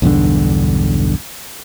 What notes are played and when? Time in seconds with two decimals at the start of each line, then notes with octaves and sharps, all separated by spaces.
0.02 B1 E2 G2 D3